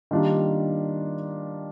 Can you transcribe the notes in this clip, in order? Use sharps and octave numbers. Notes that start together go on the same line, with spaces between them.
D#3 G3 A#3 D4 F4